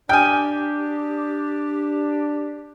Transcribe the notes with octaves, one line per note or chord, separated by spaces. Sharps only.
D4 G4 G5 G#5 D#6 F6 G6